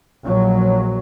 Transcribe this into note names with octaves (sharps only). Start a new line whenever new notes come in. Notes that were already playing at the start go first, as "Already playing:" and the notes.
A#1 F#3